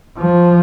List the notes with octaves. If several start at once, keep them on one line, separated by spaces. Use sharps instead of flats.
F3